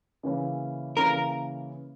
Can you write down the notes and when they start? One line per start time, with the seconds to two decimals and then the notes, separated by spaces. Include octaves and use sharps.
0.23 C#3 E3 A#3 C#4
0.97 C#3 E3 A#3 C#4 A#4